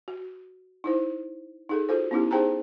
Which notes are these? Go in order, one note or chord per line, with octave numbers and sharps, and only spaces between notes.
F#4
D#4 E4 C5
D#4 G#4 A4
F4 F#4 A4 C5
B3 C#4 D#4 E4 G4
D#4 G#4 C5 G5 A5 A#5